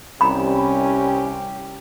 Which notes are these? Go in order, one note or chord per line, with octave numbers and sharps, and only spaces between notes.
C2 C#4 G4 A#5 B5